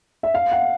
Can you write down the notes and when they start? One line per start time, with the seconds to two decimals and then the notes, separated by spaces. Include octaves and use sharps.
0.23 E5
0.34 F5
0.52 F#5